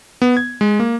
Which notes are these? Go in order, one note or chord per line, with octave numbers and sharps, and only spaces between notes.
B3
G#6
G#3
A#3